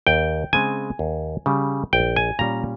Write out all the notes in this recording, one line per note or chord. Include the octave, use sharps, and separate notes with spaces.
D#2 G5
C#3 G#3 C4 G#5
D#2
C#3 G3
A#1 G5
G#5
A#2 G3 C#4 A#5